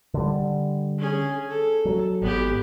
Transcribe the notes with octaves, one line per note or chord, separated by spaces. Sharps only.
D3 G3
C#4 G#4
A4
F#3
G#1 B3 G4